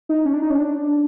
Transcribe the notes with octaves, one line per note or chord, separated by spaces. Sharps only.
D#4
C#4
D4
D#4
C#4
D4